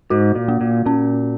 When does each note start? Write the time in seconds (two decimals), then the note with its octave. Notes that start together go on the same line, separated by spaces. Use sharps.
0.10 G#2 F#4
0.35 A#2
0.48 A#3
0.61 A#2
0.86 A#2 C#4